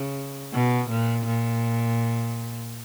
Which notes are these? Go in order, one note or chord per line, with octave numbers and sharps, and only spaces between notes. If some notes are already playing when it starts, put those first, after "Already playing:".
Already playing: C#3
B2
A#2
A#2